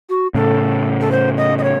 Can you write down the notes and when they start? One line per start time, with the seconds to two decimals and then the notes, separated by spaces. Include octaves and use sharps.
0.09 F#4
0.34 A2 C#3 A4
1.01 A4
1.12 C5
1.37 D#5
1.58 D#5
1.63 C#5